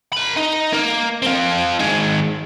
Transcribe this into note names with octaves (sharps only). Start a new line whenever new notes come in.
A#4 B5
D#4
A#3 A#4
C4 F4
D#3 G#3